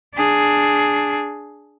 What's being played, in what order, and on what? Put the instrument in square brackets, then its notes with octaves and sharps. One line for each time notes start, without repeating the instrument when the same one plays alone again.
[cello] D4 G#4